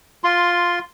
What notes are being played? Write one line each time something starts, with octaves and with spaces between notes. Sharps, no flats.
F4 C6